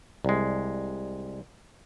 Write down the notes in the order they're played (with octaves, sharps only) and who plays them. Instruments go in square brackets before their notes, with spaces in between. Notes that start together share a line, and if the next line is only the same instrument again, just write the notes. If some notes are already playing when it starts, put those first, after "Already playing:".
[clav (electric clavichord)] C2 G#3